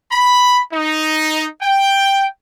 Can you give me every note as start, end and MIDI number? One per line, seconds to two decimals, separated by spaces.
0.12 0.60 83
0.73 1.46 63
1.62 2.26 79